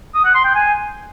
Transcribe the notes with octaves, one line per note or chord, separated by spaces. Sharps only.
D#6
F#5
C6
G5
G#5